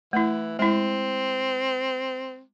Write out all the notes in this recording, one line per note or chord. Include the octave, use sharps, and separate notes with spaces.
E3 A3 E4
G#3 C4 E4